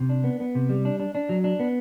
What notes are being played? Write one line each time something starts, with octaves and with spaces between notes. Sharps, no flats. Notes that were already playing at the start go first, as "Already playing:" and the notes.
Already playing: C3
D4
B3
B3
C3
G3
D4
D4
D4
F#3
D4
B3